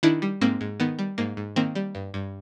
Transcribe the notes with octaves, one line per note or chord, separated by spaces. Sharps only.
D#3 D4 E4
G3
G#2 A#3 C4
G#2
D#3 B3
G3
G#2 A#3
G#2
D#3 A#3 C4
G3
G2
G2